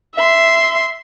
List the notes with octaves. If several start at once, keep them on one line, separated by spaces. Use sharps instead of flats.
E5 C6